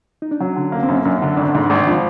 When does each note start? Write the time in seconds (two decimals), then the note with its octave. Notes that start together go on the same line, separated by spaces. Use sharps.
0.22 D#4
0.31 D4
0.40 F#3 C#4
0.56 D3
0.72 A#3
0.83 C4
0.88 F#2 C#4
1.05 F#2 D4
1.22 D3 D4
1.37 G#1 D4
1.55 G#2
1.70 G#1
1.76 D#4
1.87 F3 D4